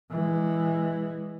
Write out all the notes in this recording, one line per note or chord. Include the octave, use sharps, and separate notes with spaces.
E3 G#3